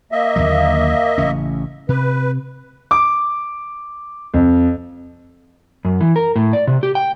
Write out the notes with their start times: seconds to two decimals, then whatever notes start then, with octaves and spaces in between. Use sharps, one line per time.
0.12 A#3 D#5 E5
0.36 D#2 D3 F#3
1.18 A1 C#3 C#4
1.89 C3 B4
2.91 D6
4.34 F2
5.85 F#2
6.01 E3
6.16 A#4
6.36 A2
6.53 D5
6.67 C3
6.83 G4
6.95 G5